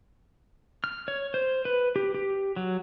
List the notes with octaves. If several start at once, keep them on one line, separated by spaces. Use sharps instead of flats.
F6
C#5
C5
B4
G4
G4
F#3